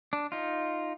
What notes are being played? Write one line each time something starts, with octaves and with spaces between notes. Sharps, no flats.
D4
D#4 F4